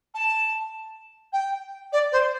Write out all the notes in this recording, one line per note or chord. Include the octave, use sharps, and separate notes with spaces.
A5
G5
D5
C5